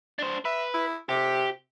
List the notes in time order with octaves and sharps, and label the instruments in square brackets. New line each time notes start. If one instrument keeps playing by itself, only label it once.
[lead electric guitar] D4 C5
[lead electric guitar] B4 [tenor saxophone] E5
[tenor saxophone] E4
[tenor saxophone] C3 [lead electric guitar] G4